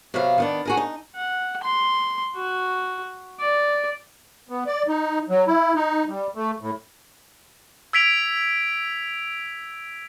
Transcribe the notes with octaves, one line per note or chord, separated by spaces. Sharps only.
C3 F#3 B3 E5 F5
D#3 B3 D4
F#4 G#4 A#4
D#4
F#5
C6
F#4
D5
B3
D5
D#4
F#3
E4
D#4
G3
A3
A2
E6 G#6 B6 D7 F7